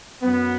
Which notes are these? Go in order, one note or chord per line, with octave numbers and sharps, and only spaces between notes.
F#2 F#3 B3